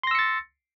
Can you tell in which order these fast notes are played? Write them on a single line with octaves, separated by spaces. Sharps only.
C6 A#6 E6 C#7 A6